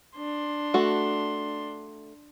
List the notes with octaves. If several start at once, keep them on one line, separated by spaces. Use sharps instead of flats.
D4 C6
A3 F#4